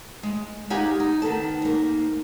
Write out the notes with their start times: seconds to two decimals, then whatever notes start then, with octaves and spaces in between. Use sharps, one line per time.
0.23 G#3
0.70 G#3 D#4 G4 F5 F#5 G#5
1.00 D#4
1.22 D#3 B3 A4 A5
1.62 G#2 A#3